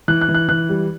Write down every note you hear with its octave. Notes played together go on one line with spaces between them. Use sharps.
E3 F#6
F#6
E3
F#6
E3 F#6
G3